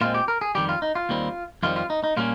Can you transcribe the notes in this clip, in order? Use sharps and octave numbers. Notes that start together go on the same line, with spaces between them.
A#2 G#3 C4 F4
G4
A#4
G#4
F2 D#3 G3 G4
F4
D#4
F4
D#2 D#3 G3 C4
F2 D#3 G3 C4 F4
F4
D#4
D#4
A#2 G3 A#3 C#4 F4